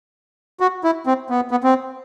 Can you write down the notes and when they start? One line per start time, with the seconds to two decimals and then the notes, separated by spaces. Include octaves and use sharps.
0.60 F#4
0.84 E4
1.07 C4
1.30 B3
1.51 B3
1.64 C4